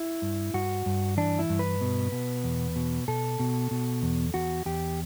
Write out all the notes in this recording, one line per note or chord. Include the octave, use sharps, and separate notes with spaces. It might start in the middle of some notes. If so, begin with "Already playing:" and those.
Already playing: E4
G2
G2 F#4
G2
E3 D4
E4
G2
B4
B2
B2
E2
B2
B2 A4
B2
B2
E2
E2 F#4
E2 G4